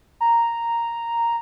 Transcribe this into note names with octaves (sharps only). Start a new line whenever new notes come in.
A#5